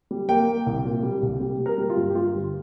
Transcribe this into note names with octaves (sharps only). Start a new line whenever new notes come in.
G3
A#3 G5
A#3
C2
A#2
G3
C2
G3
G3
A#4
G3
F4
G2
G4
G3 F4
G1